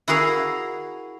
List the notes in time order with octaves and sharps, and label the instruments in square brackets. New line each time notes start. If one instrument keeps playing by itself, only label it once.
[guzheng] E4 F#4 G#4 A#4 F5